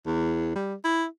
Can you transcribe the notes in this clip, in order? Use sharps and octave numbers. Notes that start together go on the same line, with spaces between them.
E2
G3
E4